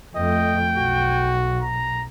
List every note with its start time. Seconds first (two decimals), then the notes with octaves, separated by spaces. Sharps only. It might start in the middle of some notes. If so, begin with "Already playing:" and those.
0.15 F2 A3 D#5 G5
0.77 B1 F#4
1.61 A#5